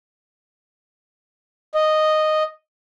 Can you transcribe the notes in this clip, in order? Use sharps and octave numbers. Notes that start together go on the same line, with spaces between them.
D#5